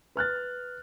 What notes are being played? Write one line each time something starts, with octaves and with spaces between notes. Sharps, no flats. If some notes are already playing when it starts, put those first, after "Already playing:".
B4 F6 F#6 A6